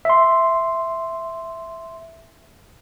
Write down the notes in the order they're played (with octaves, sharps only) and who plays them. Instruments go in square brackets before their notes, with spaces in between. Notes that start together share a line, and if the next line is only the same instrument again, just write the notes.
[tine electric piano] E5 C6